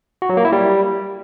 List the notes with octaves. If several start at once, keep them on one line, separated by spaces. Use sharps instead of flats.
F#4
F#3
A#3
E4
G3